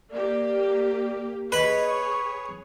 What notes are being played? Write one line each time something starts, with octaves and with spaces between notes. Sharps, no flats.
A#3 G4 D5
G#4 B4 C#5 D#5 B5
C#6